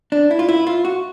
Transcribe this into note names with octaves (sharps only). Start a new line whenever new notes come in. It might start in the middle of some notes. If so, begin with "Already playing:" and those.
D4
E4
F4
E4
F4
F#4